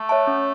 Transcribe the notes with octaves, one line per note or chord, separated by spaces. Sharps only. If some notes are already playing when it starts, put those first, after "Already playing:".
Already playing: A3
C#5 E5 A5
C#4